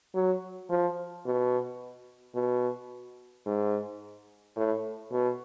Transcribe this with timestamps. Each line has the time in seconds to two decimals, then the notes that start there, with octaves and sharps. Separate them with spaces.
0.15 F#3
0.70 F3
1.25 B2
2.35 B2
3.46 G#2
4.56 A2
5.12 B2